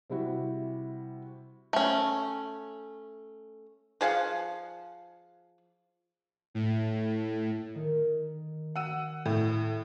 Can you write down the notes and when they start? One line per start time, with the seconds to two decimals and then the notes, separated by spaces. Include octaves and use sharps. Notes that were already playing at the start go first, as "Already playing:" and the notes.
0.10 C3 G3 E4 F#4
1.73 A3 C#4
4.01 F3 G#4 F5 F#5
6.55 A2
7.75 D#3
8.76 F#5 E6 D#7
9.26 A2